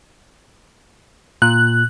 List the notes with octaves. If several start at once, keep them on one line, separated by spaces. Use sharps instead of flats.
A#2 F#6